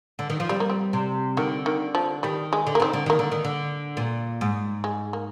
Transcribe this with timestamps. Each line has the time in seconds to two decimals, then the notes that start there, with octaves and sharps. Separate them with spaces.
0.19 D3
0.30 D#3
0.40 F3
0.49 G3 C4
0.60 A#3
0.70 C4
0.93 C3
1.37 D3 D#3
1.66 D#3
1.95 F3
2.23 D#3 G3
2.53 G#3
2.67 D3
2.75 A#3
2.80 D#3 C4
2.93 D3
3.06 D#3 A#3
3.19 D3
3.31 D#3
3.44 D3
3.97 A#2
4.41 G#2
4.84 G#3
5.13 A#3